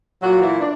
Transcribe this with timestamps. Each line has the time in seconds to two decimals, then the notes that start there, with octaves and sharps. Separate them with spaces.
0.22 A#2 F#3 F#4
0.41 E3 E4
0.60 D4